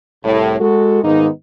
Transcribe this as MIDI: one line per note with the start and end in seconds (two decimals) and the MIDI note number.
0.24 0.55 36
0.24 0.55 45
0.60 1.02 56
0.60 1.02 66
0.60 1.02 69
1.04 1.28 44
1.04 1.28 51
1.04 1.28 56
1.04 1.28 58
1.04 1.28 59
1.04 1.28 63